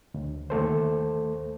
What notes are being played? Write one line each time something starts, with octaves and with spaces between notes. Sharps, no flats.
D2
D#2 A3 A4 C5